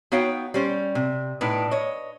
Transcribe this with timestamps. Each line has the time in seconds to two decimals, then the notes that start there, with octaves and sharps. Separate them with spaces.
0.12 B3 D#4 F#4 C#5 F5 G5
0.54 G3 C#4 C5
0.95 C3
1.41 A2 D4 D#4 B4
1.71 C#5 D#5